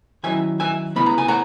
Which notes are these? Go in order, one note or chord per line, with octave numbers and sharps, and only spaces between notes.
D#3 F#3 C#4 E4 E5 G#5
E5 G#5
C#3 G#3 B3 E4 B5
A#5
G#5
F#5 A#5